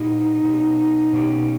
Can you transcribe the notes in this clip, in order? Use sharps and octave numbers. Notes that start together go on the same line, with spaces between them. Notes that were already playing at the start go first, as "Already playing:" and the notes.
Already playing: A#2 A#3 D#4 E4 G4
B2 A#3 C#4 G4
B2 A#3 C#4 G4